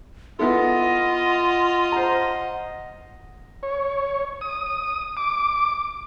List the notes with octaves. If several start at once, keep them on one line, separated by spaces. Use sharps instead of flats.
B3 E4 F4 A4 D#5 F#5
C5 F#5 A#5
C#5
D#6
D6